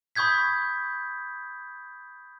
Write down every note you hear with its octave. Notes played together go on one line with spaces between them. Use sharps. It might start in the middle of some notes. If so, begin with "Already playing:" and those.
B5 C#6 D#6 G6 G#6 B6